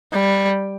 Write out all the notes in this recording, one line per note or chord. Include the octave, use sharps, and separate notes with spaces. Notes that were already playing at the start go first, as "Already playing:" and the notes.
G3